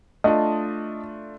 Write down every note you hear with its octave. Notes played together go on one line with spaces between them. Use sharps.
A3 D4 F4 D#5 A5